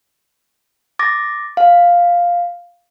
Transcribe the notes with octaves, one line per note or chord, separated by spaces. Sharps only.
D6 A6 A#6
F5